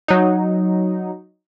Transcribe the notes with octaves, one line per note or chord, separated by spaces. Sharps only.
F#3 D#4